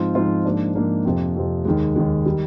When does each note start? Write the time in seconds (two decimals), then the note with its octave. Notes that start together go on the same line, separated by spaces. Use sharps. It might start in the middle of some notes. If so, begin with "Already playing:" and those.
Already playing: G#2 F3 C4 F4
0.15 G#2 F3 C4 F4
0.45 G#2 F3 A#3 D4
0.75 G#2 F3 A#3 D4
1.05 F2 C3 F3
1.35 F2 C3 F3
1.65 D#2 D#3 G#3
1.96 D#2 D#3 G#3
2.26 D#3 G3